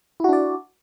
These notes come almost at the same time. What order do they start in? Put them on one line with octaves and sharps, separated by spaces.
E4 F#4 D4 D5